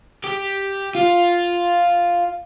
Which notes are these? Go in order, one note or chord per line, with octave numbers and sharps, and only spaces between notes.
G4
F4